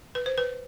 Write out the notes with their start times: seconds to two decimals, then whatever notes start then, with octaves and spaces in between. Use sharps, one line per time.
0.15 B4
0.26 C5
0.38 B4